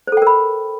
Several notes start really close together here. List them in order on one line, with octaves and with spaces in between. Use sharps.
C5 A4 G5 A#4 B5